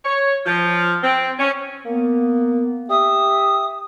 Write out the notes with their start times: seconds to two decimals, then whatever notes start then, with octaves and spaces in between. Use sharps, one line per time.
0.05 C#5
0.46 F3
1.02 C4
1.39 C#4
1.86 A#3 B3
2.90 G4 E5 D#6